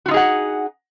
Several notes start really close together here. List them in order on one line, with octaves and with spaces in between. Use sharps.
F#4 F4 D#4 G#4 F#5